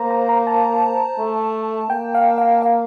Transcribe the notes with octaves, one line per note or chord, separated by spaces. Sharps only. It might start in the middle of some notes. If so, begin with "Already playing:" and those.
Already playing: A#3 C5 A#5
A#5
A#5
A5
A3
A#3 G5
F5
F5
F5